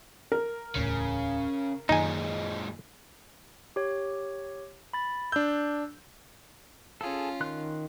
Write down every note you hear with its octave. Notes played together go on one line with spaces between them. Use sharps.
A#4
D1 E2 A2 C#3
F#2 A#2 D#3 G#3 D#4 G#5
G4 C#5
B5 A6
D4 E6 G6
C#4 F4 G#4 A4
D#3 C6 F#6